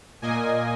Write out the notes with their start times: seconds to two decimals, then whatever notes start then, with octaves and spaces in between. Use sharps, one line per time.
0.22 A#2 A#3 D#5 G#5